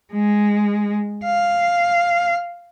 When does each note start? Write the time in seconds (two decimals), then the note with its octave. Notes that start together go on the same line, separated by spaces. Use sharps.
0.14 G#3
1.25 F5